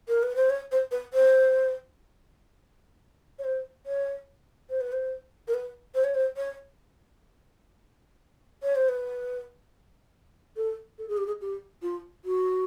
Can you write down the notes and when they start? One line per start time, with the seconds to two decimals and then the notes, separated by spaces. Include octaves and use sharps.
0.08 A#4
0.23 B4
0.36 C5
0.50 C#5
0.72 C5
0.91 B4
1.14 C5
3.39 C#5
3.44 C5
3.86 C#5
4.70 C5
4.81 B4
4.92 C5
5.48 A#4
5.54 B4
5.95 C5
6.04 C#5
6.15 C5
6.37 C#5
8.63 C#5
8.76 C5
8.89 B4
10.57 A4
10.98 A4
11.08 G#4
11.17 G4
11.27 G#4
11.41 G4
11.82 F4
12.25 F#4